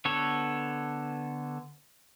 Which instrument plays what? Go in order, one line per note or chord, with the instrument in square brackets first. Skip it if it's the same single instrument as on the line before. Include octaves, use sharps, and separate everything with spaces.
[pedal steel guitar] D3 B3 A4 C#5